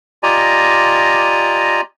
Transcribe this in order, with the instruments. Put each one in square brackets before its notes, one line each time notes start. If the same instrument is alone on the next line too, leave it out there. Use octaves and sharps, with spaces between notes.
[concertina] F4 G4 D5 D#5 G#5 A#5